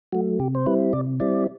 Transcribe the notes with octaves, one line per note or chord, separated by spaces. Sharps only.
F#3 A3 F#4
C3 G4
C5
G3 C4 E4 B4
C3 D5
G3 C4 E4 D5